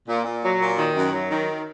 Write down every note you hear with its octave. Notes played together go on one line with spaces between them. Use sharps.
A#2
A#2
F#3
A#2
D#3
F#2
F#3
D#3